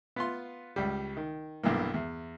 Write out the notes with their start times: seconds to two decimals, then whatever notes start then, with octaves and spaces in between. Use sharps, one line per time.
0.16 B3 F4 C6
0.76 C#2 G3
1.17 D#3
1.63 B1 G2 E3 A#3
1.94 E2